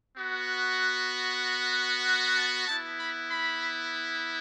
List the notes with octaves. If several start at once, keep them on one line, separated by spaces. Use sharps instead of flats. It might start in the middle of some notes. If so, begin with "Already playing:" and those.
B3 F#4
F#5
A5
B3 E4 A5
B5
B5